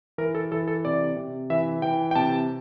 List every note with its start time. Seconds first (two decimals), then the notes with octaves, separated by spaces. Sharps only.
0.18 E3 A#4
0.35 A4
0.52 E3 A4
0.68 A4
0.85 C3 D5
1.16 C3
1.50 E3 E5
1.82 E3 G5
2.11 G5
2.15 C3 A5